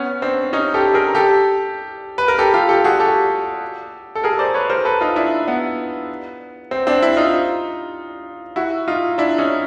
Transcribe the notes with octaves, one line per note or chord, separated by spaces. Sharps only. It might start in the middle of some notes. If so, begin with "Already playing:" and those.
Already playing: B3 C#4
C4 D4
C#4 D#4
G4 A4
G#4 A#4
G4 A4
B4
A#4
G4 A4
F4 G4
G4 A4
F#4 G#4
G4 A4
A4
G#4 A#4
C5 D5
B4 C#5
A#4 C5
A4 B4
D#4 F4
D4 E4
B3
C4
C4 D4
D4 E4
D#4 F4
E4 F#4
D#4 F4
D4 E4
C#4 D#4